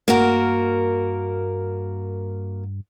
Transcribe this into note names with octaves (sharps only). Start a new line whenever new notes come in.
G2 A#3 F#4 A#4